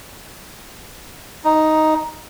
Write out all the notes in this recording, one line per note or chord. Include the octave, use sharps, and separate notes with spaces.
D#4